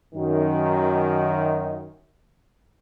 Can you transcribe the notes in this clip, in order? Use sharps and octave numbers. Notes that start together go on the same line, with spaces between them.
F#2 D#3